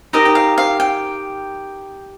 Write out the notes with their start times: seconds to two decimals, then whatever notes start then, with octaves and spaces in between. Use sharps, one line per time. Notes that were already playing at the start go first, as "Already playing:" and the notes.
0.13 D#4 G4 A#4 D#5
0.25 G5
0.35 F5
0.58 F5
0.80 G5